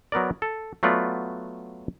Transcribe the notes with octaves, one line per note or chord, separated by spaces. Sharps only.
F#3 B3 A#4 D5
A4
F#3 A3 B3 F4 D5